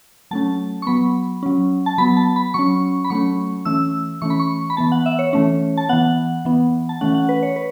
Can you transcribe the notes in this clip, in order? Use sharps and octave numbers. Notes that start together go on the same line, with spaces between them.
F#3 A3 C#4 A5
C#6
F#3 B3 B5
F#3 C#4
A5
F#3 B3 B5
A5
B5
F#3 C#4 C#6
B5
F#3 A3 C#4 C#6
E3 A3 C#4 E6
E3 A3 C#4 C#6
B5
C#6
B5
E3 B3 A5
F#5
E5
C#5
E3 A3 C#4
A5
E3 B3 F#5
E3 B3
A5
E3 A3 C#4 F#5
F#5
B4
C#5
B4